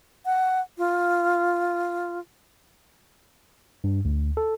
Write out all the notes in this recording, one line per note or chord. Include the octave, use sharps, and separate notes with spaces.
F#5
F4
G2
D2
A4